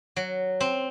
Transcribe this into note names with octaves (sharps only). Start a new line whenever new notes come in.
F#3
C4